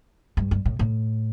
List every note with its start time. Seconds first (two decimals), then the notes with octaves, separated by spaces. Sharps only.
0.37 G2
0.51 G2
0.65 A2
0.79 A2